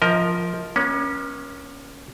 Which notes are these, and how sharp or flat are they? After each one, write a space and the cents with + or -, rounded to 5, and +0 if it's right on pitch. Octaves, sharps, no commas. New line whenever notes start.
F3 +5 A#4 +0 D#5 +35
A#3 +45 C#4 +0